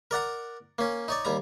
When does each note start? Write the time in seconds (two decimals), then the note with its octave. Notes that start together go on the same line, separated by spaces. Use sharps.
0.11 A#4 D5 F#5 A#5
0.78 A#3 C#4
1.08 D#4 C#5 D5
1.25 D#2 G3 A#5